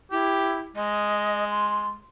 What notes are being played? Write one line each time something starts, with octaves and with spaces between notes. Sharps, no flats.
E4 G4
G#3 D#5
C6